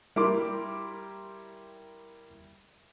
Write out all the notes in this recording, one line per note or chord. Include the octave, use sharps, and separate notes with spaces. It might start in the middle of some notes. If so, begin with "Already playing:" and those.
G3 E4 G4 A#4 C6 D6